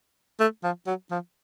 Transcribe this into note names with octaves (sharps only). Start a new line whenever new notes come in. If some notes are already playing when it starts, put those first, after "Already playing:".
A3
F3
F#3
F3